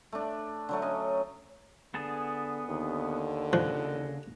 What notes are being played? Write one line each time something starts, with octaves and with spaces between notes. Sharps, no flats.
A3 D4
D3 F#3 A3
C#4 D#5
D3 B3 G#4 A5
D#2 D3
C#3 F3 D#5 F#6